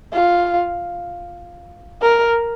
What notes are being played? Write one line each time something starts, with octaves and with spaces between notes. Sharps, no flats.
F4
A#4